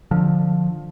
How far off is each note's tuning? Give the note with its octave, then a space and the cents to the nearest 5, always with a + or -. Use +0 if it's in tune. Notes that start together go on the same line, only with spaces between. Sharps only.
D3 +15 F3 +15